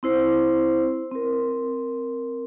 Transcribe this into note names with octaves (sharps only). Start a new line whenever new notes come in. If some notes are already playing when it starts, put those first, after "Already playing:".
C4 E4 C5
C4 A#4